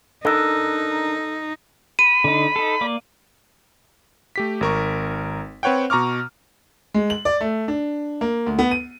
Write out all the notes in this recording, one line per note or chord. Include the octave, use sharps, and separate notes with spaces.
D4 D#4 A4 A#4 E6
B5 D#7
D3 D#4
D#4 A4
A#3 D5
A3 G4 B6
G#1 A#4 C#6
C4 B4 C#5 F#5 G5
B2 A#5 C#6 D6 F6
G#3
F#7
D5
A3
D4
A#3
D2
B3
D#7